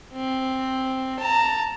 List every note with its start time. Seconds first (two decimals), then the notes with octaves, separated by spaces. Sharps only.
0.14 C4
1.19 A5 A#5